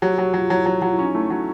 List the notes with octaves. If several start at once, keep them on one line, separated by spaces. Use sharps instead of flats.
F#3 G4
F#3 F#4
G4
F#3 F4
F#3 E4
F#3
F#3 F4
E4
C#4
D#4
A3 E4
F#3